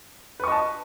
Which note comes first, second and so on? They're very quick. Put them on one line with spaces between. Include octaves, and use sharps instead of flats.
B4 C#6 D#5 A5